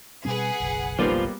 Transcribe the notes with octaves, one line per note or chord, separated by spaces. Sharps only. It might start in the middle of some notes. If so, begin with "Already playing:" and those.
B2 G3 C4 G#4 B4 F#5
F#1 B1
G3 A#3 B3 F4 C5